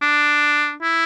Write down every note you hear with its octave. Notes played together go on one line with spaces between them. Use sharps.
D4
E4